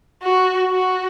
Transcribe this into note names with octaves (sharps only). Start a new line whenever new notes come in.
F#4
F#4